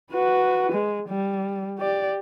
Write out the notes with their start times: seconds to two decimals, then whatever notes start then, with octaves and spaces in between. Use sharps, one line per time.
0.12 F#4 B4
0.72 G#3
1.09 G3
1.79 G4 D5